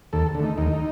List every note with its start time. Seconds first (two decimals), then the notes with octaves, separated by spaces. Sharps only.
0.13 D#2 A4
0.35 D3
0.40 A3 D#4
0.58 D#2 D#4